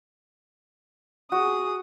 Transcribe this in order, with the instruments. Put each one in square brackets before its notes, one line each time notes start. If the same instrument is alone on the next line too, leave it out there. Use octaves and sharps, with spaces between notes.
[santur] F#4 [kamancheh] G#4 D#6